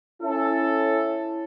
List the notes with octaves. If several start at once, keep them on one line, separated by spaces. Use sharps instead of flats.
C#4 E4 A4